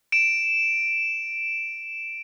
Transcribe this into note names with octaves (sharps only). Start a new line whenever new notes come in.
D7 E7